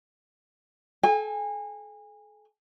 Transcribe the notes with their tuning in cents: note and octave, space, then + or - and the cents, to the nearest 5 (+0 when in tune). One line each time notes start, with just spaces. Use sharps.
A4 -40 G#5 -30